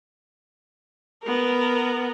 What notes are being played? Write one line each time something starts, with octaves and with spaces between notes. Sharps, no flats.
B3 A#4